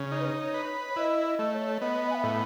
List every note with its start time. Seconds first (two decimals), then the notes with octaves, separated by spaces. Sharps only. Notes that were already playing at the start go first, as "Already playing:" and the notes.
Already playing: C#3
0.11 D#4 C#5
0.19 B4
0.28 C#5
0.54 B4
0.96 E4 D#5
1.24 D#5
1.39 A3
1.53 C#5
1.80 B3 D#5
2.10 G#5
2.14 E5
2.24 A2